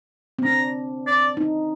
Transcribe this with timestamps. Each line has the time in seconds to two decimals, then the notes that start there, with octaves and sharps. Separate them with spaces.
0.39 C4
0.45 D4 A#5
1.07 D5
1.37 D#4